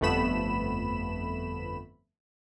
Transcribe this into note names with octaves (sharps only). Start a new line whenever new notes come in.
G1 F2 A3 B3 B5 E7